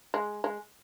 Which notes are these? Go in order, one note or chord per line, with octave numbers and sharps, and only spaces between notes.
G#3
G#3